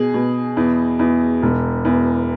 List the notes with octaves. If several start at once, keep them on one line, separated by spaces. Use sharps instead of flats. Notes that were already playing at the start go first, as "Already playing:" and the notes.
Already playing: B2 G#4
B2
E2
E2
E1
E2